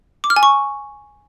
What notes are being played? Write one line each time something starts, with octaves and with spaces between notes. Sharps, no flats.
D6
F6
G#5
C#6